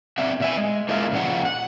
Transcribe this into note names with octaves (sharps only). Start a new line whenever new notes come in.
C4 D4 E5 F#5
A#2 E5 G#5
G#3
A#3 E4 F4 G#4 A#4
F2 A#2 C#3 F3 F#5
F#5